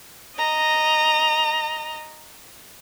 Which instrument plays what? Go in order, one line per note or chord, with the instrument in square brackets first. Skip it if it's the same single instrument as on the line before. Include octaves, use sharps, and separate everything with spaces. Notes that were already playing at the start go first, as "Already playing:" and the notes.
[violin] D#5 A#5